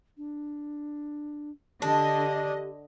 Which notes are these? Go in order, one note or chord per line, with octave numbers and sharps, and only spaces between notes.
D4
D3 D4 G4 D#5